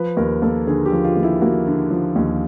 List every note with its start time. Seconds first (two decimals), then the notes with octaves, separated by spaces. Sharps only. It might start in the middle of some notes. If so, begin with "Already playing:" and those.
Already playing: F3 B4
0.17 D#2 A#4
0.42 A#3 A4
0.67 D3 G#4
0.86 G4
0.92 F3
1.04 F4
1.16 D#2
1.23 E4
1.41 A#3 F#4
1.67 D3
1.91 F3
2.16 D#2